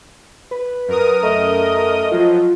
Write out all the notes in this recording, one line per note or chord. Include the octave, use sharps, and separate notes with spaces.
B4
F#2 A#4 D#6
A3 D#5 A#5
F3 F#3 F4